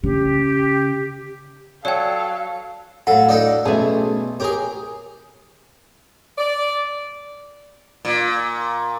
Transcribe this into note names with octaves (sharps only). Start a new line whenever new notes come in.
C#3 G4
F#3 A4 D5 F5 G5
A2 F#3 A4 F5 F#5
D4 D#4 A4
B1 A3 C#4 G#4 A5
G4 G#4 A#4 C#5
D5
A#2